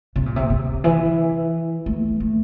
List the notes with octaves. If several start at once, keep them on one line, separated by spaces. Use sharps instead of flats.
C3
A#2
C3
C3
E3
A3
A3